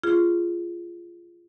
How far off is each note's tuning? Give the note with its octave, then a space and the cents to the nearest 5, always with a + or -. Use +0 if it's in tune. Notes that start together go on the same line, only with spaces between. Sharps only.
F4 -15 G#4 +0